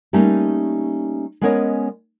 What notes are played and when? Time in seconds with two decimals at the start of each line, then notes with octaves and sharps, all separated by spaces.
0.13 G3 A3 A#3 C#4 D#4
1.41 G#3 B3 C#4 A#4 C#5 D#5